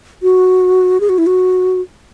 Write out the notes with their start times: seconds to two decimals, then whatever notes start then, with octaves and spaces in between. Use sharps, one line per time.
0.22 F#4
1.00 G#4
1.09 F#4
1.18 E4
1.26 F#4